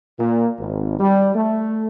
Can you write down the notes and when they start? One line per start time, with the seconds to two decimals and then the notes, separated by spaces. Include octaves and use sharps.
0.19 A#2
0.58 G#1
1.00 G3
1.35 A3